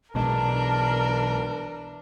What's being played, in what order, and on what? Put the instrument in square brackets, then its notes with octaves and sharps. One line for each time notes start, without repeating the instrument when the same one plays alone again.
[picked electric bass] B1 B2 G#3 [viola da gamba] E3 D4 [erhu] A#4 [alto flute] A5